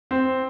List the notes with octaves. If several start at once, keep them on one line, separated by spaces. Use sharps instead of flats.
C4